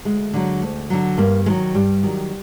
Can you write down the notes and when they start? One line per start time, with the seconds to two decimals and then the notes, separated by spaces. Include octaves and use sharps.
0.05 D2 G#3
0.34 D3 F#3
0.62 D2
0.90 D3 F#3
1.17 G2 A#3
1.46 D#3 F#3 G#3
1.74 G2 G3
2.03 D#3 F#3